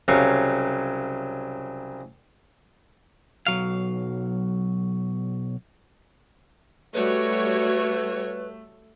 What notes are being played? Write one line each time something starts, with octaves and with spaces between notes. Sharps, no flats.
C2 C#3 F#3 F5 C#6
B1 F#3 F5
G3 A3 F#4 B4 C#5